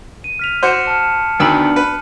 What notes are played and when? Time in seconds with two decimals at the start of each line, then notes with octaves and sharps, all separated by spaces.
0.24 D#7
0.39 F6 B6 F7
0.63 F#4 C5 D6 C#7 E7
0.87 A5 F6
1.40 D2 D#3 B3 D4 B5 E6
1.76 B4